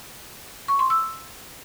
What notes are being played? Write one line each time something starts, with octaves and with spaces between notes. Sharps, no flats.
C#6
C6
E6